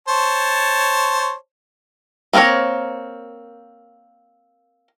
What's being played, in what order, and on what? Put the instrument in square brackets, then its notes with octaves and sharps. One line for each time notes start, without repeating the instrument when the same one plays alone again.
[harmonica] C5 C#5 A5
[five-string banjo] A#3 C4 F4 A#4 C#5